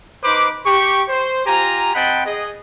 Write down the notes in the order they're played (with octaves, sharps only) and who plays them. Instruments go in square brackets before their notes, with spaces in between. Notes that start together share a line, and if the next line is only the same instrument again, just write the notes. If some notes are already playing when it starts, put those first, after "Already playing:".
[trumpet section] D#4 B4 C5 B5 D6
G4 C#6
C5
F4 G4 G#5 A#5
C4 D#5 F#5 G5 A5 B5
G#4 D#5